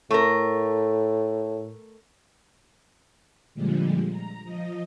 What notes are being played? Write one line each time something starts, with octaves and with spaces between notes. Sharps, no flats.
A2 A3 A#4
A#2 D3 F3 G3 G#3
A#5
F3 D#5